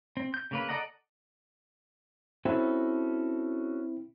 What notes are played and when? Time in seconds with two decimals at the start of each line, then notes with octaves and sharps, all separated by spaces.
0.17 C4
0.34 G6
0.51 C#3 A#3 B4
0.69 A4 D5 D#5 F#5 A#5
2.45 C4 C#4 E4 F#4 A4